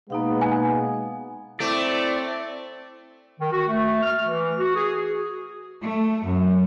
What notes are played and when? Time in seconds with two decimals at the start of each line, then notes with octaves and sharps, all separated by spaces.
0.10 B2 G#3 A#3 B3 D#4 F5
0.41 G#5
1.60 A3 C4 E4 D5
3.40 D#3
3.52 F#4
3.68 A3
4.03 F6
4.24 E3
4.59 F#4
4.75 G#4
5.80 A3
6.25 F#2